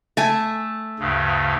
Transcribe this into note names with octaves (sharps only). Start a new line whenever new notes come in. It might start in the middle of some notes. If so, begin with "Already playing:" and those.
A3 G#5
D2 G2 C#3